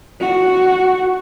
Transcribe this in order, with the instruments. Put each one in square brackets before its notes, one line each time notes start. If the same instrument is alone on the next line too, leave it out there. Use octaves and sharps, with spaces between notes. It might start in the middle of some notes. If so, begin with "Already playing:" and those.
[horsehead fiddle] F#4